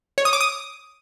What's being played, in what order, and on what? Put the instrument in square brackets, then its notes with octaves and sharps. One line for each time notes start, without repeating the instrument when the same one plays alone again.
[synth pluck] C#5
D#6
D6
D#6